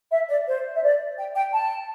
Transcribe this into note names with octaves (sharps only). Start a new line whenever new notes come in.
E5
D5
C5
E5
D5
G5
G5
A5